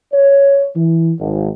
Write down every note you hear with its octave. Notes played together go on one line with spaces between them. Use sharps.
C#5
E3
G#1